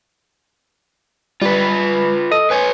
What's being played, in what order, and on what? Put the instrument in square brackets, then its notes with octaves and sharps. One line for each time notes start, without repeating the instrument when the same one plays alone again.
[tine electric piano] G3 [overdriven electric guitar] F4 B4
[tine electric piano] A4 D#5 D#6
[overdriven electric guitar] B4 C#5 [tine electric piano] G#5